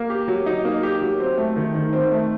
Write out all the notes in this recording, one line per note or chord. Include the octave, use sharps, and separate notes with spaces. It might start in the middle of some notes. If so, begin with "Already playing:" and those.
Already playing: A#3
G4
F#3
D#4
A#3
G4
F#3
C4
A3
D#3
D#3
C4
A3